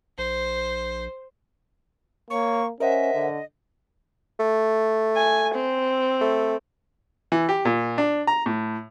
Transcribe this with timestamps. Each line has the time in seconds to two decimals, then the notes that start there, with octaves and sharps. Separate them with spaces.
0.18 A#1 C5
2.30 A#3 C#5 C#6
2.80 C#4 A#4 C5 D#5 E5 F#5
3.14 D3
4.40 A3
5.16 G#5
5.55 C4
6.21 A3
7.32 E3
7.49 G4
7.65 A#2
7.98 D4
8.27 A#5
8.46 A2